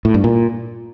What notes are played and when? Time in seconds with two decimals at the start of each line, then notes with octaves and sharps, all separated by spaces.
0.05 A2
0.14 G2
0.24 A#2